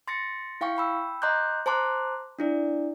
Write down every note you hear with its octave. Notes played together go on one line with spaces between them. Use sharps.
C6 A6 A#6 C#7
E4 F5 G5 C#6
G5 B5 E6
D#5 A#5 C6 D6 F#6 G6
C5 A5 A#5 C6 D6 F#6
D4 E4 D5